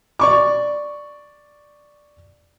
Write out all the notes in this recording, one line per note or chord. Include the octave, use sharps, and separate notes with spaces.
D5 C#6 D6